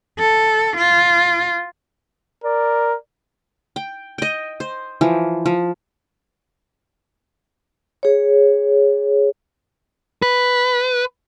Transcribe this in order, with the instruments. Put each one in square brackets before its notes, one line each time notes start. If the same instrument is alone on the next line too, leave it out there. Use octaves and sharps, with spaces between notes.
[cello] A4
F4
[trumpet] A#4 [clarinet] D5
[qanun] G5
D#5 G5
C5
E3 F3
F3
[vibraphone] G#4 C#5
[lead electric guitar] B4